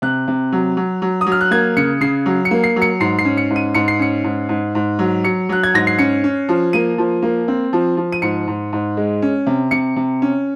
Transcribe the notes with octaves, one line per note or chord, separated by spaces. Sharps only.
C3 F#6
C3
F#3
F#3
F#3
D#6
F#3
F6
F#6
A#3 G#6
C#3 C#7
C#3 C7
F#3
C#7
A#3
C7
F#3
C#7
G#2 C7
C7
C#4
C#7
G#2
D#7
G#2 C#7
C7
C#4 C#7
G#2
G#2
G#2
F#3
F#3 C#7
F#3 F#6
G#6
G#2 A#6
C7
C#4 C#7
C#4
F3
A#3 D#7
F3
A#3
C4
F3
F3
D#7
G#2 C#7
G#2
G#2
G#3
C#4
C3
C3 C#7
C3
C#4